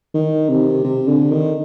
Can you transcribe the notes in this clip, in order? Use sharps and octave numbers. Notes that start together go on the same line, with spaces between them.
D#3
C3
C3
D3
D#3